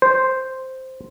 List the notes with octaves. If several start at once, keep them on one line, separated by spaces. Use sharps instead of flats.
C5